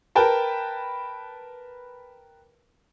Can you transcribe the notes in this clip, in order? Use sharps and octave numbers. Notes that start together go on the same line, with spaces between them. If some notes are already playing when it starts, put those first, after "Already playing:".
A#4 B4 G5 A5 B5